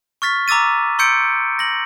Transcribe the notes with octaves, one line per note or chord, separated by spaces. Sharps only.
C#6 F6 A6 B6
A#5 D6 E6 A6 D#7
C6 E6 G6 C#7 D7
A#6 F#7